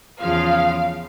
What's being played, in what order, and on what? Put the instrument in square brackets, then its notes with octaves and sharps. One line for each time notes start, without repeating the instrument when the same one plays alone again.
[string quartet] E2 C#3 F3 [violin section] F5